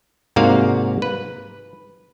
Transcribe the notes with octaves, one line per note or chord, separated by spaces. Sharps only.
G#2 C3 A#3 F#4 D5 F5
B4